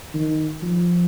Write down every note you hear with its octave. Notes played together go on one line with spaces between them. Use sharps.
D#3
F3